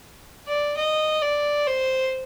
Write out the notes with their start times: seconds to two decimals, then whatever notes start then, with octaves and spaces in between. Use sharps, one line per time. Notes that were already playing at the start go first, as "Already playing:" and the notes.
0.48 D5
0.77 D#5
1.22 D5
1.67 C5